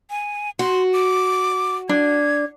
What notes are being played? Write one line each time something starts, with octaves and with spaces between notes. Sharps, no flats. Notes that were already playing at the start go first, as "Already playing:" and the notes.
G#5
F#4 C6
D6
D4 G#6